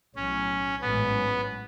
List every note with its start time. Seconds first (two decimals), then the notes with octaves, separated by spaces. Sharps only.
0.16 B1 A2 F#3 C#4
0.82 A1 G#2 F#3 B3 C#4